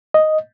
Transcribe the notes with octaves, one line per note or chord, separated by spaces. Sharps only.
D#5